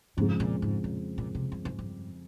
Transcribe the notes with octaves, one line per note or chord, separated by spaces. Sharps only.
F2 G#2 C#3 G#3
A#2
G#2
A#2
A#2
C3
G2
G#2
G2